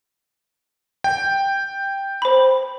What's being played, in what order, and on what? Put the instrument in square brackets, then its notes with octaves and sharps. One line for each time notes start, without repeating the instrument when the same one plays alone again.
[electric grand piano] G5
[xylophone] C5 B5